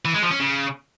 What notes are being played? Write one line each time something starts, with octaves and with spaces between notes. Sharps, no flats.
E3
G#3
F3
C#4
C#3